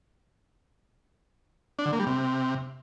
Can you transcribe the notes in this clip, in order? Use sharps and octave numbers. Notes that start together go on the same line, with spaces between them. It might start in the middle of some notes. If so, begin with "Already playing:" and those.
D4
D3
A#3
G3
C3